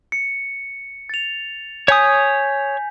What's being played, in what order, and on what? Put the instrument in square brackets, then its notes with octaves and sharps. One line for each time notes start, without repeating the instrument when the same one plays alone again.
[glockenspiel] C#7
A6 F7
[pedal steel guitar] C#5 D#6 [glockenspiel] G#5 G6 B6